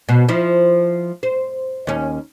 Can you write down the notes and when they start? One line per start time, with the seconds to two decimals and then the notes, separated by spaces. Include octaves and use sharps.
0.09 B2
0.28 F3 E4
1.23 C5
1.87 D#2 C#4